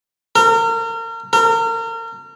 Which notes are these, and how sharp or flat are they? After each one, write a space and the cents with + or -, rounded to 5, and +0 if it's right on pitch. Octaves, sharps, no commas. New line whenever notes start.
A#4 -35
A#4 -35